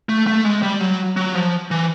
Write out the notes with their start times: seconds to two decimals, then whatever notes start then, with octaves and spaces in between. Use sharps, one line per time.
0.09 A3
0.27 A3
0.45 G#3
0.62 G3
0.81 F#3
1.17 F#3
1.35 F3
1.71 E3